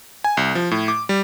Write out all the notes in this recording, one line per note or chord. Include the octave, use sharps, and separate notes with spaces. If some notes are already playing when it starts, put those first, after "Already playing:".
G#5
C2
F3
A2
D6
G3